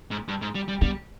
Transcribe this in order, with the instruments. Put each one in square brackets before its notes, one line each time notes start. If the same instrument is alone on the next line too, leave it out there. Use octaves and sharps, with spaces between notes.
[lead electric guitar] G#2
G2
G#2
G3
G3
[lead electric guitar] G3 [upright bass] B3